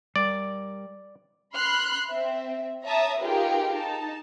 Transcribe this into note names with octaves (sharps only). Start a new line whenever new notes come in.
G3 A#4 D5
B5 C6 F6 F#6 C7
C4 E5
C#5 E5 A5 A#5 D#6
D#4 F4 G4 G#4 A#4 B4
D#4 A5